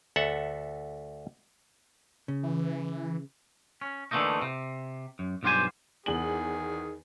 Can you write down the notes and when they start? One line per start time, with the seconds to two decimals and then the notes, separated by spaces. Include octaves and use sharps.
0.16 D2 A4 E5 F#5
2.28 C#3
2.43 E3
3.81 C#4
4.11 D3 E3 F3 A3 A#3 D#4
4.42 C3
5.19 F#2
5.43 B1 G2 F4 G4 C5 G#5
6.06 E2 D#3 G#4 F#7